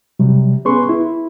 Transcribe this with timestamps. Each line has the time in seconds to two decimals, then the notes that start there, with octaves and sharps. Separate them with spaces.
0.19 C3 F#3 G3
0.65 B3 C#4 G#4 B4 C6 C#6
0.89 E4